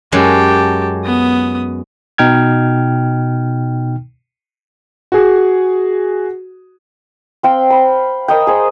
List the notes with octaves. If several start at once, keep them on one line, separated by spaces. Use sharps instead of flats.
F#2 F#3 G#3 G4 A5
B3 D#6
B2 D#4 G5 F6 G#6
F#4 G#4
C4 F5 G5
B5
A#4 D#5 G5
G#4 C5